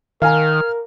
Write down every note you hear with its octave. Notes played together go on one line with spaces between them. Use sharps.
D#3 A#4 F5 G#5 A#5 F6